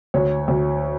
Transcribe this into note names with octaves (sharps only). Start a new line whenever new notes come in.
D2 C#5
D2